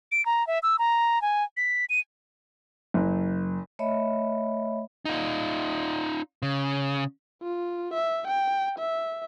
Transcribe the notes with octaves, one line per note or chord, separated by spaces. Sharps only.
D7
A#5
E5
E6
A#5
G#5
B6
D#7
F#1
A3 C#5 D#5 E5 B5
D#4 F4
C#3
F4
E5
G5
E5